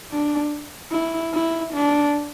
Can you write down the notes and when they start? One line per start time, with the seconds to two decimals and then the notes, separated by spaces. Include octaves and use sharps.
0.12 D4
0.92 E4
1.34 E4
1.74 D4